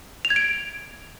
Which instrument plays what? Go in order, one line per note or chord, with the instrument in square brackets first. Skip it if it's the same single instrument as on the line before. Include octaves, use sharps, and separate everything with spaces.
[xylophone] F7
G#6
D7